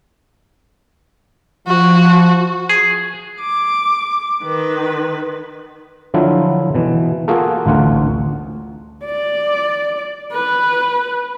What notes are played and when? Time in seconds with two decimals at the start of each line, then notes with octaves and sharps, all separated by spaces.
1.67 F3 F#4
2.69 G#4
3.41 D6
4.44 D#3 B4
6.14 D3 F3 F#3 E4 F4
6.75 B2 E3
7.28 A#3 F4 F#4 G#4 A4
7.66 A1 D2 F4 F#5
9.06 D5
10.32 B4